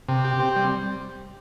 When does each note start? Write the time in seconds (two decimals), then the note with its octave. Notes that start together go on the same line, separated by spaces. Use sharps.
0.08 C3
0.24 G4
0.40 C4
0.56 G3